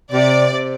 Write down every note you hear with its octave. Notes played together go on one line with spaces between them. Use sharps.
C3 D5
C3